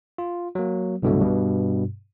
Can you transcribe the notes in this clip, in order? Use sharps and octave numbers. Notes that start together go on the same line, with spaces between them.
F4
F#3 A#3
C2 G2 B2 D3 F#3 A3
G2 B2